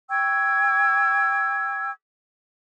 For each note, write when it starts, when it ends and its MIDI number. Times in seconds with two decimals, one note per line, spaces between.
0.09 1.91 79
0.09 1.91 85
0.09 1.91 88
0.09 1.91 92